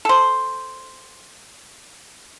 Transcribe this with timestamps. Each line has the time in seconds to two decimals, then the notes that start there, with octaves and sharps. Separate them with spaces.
0.05 A4 C5